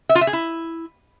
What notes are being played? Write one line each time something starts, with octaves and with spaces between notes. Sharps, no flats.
E5
F4
E5
G#4
E4